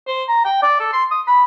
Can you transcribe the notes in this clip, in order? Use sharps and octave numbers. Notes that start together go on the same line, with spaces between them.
C5
A#5
G5
D5
A4
C6
D#6
B5